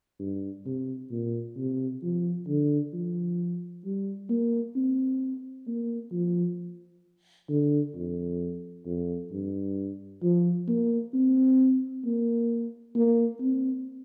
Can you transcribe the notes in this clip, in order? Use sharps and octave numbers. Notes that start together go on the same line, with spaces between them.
G2
C3
A#2
C3
F3
D3
F3
G3
A#3
C4
A#3
F3
D3
F2
F2
G2
F3
A#3
C4
A#3
A#3
C4